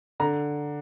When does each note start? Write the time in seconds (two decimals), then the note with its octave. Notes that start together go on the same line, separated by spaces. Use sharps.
0.20 D3 A#5